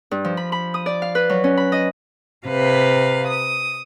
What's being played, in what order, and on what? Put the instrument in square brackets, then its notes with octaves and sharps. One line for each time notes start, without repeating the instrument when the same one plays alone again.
[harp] G2
F3
B5
B5
D#6
D5
F5
B4
F#3
C#4
B5
D#5
[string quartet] C3 B4 F5
D#6